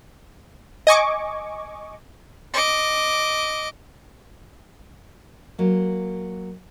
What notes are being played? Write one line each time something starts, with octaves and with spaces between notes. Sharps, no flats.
D#5 G#5 C#6 D6
D#5 D6
F#3 A#3